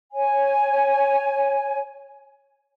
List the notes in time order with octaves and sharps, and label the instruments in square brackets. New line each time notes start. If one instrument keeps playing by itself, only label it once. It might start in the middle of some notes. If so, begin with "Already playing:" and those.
[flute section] C#5 G#5